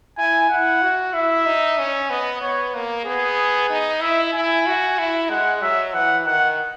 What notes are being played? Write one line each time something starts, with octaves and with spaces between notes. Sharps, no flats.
E4 G#5
E4 F#5
F#4
E4 E5
D#4
C#4
B3 D#5
B3 C#5
A#3
B3 G#4
D#4
E4 E5
E4 G#5
F#4
E4
G#3 F#5
F#3 E5
E3 F#5
D#3 F#5